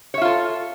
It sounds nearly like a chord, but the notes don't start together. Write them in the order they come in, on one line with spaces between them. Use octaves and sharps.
C#5 E5 F4 A4